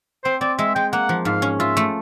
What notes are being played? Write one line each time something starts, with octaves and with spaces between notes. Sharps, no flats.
C4 C5
C4 D5
G#3 E5
G#3 G5
A#3 F#5
F3
G#2 F5
C#4
F4 E5
A3